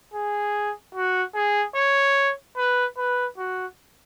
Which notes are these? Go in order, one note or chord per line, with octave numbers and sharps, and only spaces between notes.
G#4
F#4
G#4
C#5
B4
B4
F#4